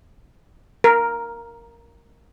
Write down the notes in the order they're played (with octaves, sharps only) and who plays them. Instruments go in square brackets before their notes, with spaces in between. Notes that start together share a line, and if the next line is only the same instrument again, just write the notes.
[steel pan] A#4